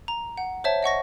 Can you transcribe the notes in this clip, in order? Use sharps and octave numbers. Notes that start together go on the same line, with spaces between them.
A#5
F#5
C5 C#5 E5 A5
D#5 F#5 C#6 A#6